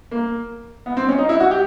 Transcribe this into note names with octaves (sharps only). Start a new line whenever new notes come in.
A#3
B3
C4
C#4
D#4
E4
F#4
G4